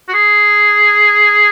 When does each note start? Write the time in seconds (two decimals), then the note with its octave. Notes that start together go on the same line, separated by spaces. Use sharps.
0.09 F#4
0.14 G#4